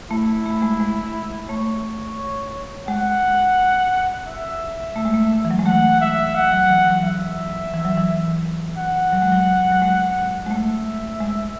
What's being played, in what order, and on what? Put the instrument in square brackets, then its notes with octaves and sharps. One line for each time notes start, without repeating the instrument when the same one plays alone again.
[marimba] A3 [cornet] E4
[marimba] A3
G#3
G#3
[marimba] A3 [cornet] C#5
[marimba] G#3 [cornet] F#5
[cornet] E5
[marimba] A3
G#3
A3
E3
F#3
G#3
[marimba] A3 [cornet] F#5
[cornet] E5
F#5
[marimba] F#3
E3
F#3
[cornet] E5
[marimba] E3
F#3
E3
[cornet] F#5
[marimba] F#3
G#3
F#3
F#3
G#3
G#3
[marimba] A3 [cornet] E5
[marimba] G#3